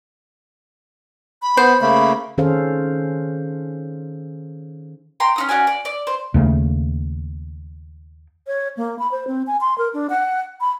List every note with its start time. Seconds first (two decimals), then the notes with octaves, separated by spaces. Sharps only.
1.42 B5
1.57 B3 C5
1.81 C#3 A3 A#3 B5
2.38 D#3 C#4 G#4 A4 C5 F5
5.20 G5 A#5 C6
5.36 C#4 D#4 D#6
5.49 C#4 F#4 D5 G#5
5.67 D5
5.85 D5
6.07 C5
6.34 D#2 C#3 A3 A#3
8.47 C#5
8.77 A#3
8.99 B5
9.11 C5
9.27 C4
9.47 G#5
9.61 C6
9.78 A#4
9.94 D4
10.10 F#5
10.61 B5